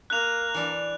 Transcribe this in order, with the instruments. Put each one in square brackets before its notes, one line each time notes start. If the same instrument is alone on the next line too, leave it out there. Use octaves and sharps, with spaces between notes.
[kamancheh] A#3 [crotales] F#6 F7
[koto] E3 D4